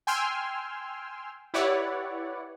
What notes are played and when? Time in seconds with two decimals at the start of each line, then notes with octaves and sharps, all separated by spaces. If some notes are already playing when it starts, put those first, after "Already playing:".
0.07 G5 G#5 C6 E6 F6
1.54 E4 G4 B4 C#5 D5 F#5